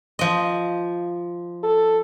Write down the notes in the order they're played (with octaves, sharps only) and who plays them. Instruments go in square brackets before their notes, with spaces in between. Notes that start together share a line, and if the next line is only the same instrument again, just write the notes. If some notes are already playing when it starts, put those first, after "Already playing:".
[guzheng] F3 D#5
[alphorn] A4